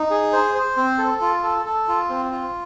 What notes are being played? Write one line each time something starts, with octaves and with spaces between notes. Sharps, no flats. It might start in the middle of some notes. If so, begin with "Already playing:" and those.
Already playing: D#4
G#4
C5
C5
C4
A4
F4
A4
A4
F4
C4
F4